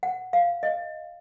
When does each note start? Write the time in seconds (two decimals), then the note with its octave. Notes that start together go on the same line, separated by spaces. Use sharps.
0.03 F#5
0.33 F5
0.63 D#5